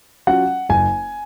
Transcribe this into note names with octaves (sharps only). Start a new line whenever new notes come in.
F#3 C#4 F4 F#5
F#1 G#5